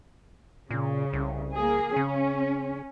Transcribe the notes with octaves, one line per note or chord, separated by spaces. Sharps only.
A#2 C#3
C2
A#3 G#4
C#3 C#4